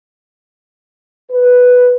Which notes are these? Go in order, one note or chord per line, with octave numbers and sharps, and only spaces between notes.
B4